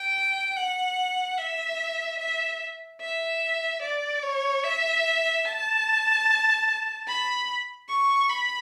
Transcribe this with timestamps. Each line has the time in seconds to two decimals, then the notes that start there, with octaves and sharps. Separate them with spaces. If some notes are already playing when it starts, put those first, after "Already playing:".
Already playing: G5
0.56 F#5
1.38 E5
2.19 E5
3.01 E5
3.82 D5
4.23 C#5
4.64 E5
5.45 A5
7.08 B5
7.89 C#6
8.30 B5